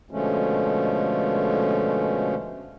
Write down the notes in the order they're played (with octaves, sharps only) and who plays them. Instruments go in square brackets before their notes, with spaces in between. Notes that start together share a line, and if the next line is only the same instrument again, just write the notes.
[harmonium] B2 D3 F3 G#3 A3 C#4